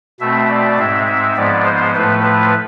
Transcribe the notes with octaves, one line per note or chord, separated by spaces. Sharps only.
B2 A3 C4 E5
D5
G#2 G#3 C4 E5
E5
G#2 F3 G#3 B3 D5
C5
A2 F3 A3 B4
B4